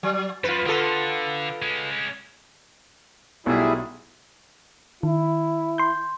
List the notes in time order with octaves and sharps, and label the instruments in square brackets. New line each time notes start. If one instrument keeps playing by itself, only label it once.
[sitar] F#3
[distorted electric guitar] F#2 [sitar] F4 B4
[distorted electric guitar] D3 [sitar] B3 F4 A4
[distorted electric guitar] G#3 C#4
[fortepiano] B1 B2 A3 [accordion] G3 E4 G#4
[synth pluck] D#3 [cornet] E4
[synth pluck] C6 G6